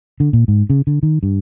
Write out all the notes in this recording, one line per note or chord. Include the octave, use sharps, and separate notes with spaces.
D3
A#2
G#2
C#3
D3
D#3
G2